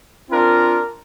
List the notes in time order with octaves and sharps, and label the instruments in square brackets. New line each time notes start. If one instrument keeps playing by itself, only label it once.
[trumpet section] C4 D4 A#4 [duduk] F4